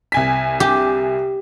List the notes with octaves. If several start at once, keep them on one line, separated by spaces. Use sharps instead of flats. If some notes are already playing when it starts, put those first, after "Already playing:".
C2 G#5 B6
G4